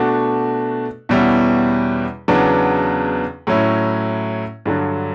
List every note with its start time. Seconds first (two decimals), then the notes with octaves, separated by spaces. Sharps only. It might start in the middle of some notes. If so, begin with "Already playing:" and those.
Already playing: B2 A3 D4 F#4
1.09 E2 B2 G3 C#4 E4
2.28 E2 C#3 F#3 B3 D4
3.47 A2 F#3 C#4 E4
4.66 G2 D3 F#3